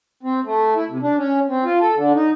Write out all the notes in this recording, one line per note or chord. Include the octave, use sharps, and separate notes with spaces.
C4
A3
E4
C3
D4
C#4
C4
F4
A4
D3
D#4